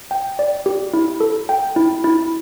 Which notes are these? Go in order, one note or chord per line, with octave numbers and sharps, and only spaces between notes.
G5
D5
G4
E4
A4
G5
E4
E4